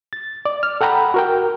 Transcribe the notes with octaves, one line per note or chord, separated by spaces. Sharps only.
A6
D5
F6
A4 F#5 G5 A#5 B5
F#4 A#4 G5